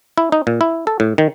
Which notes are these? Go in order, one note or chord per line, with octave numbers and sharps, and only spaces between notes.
E4
D#4
A#2
E4
A4
A2
D#3